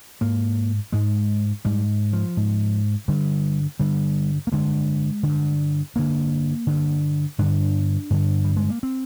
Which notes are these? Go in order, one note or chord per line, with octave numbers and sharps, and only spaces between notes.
G#2 A#3
G#2 G#3
G#2 G3
F3
G#2
G2 D3 G3
G2 D3 G3
A#3
G2 D3 G#3
G2 D3
G2 D3 A#3
G2 D3
G2 D3 D4
G2 D3
G3
G#3
A#3
C4